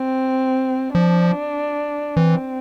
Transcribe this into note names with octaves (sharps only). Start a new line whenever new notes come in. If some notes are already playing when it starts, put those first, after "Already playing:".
Already playing: C4
F3 D4
E3 C4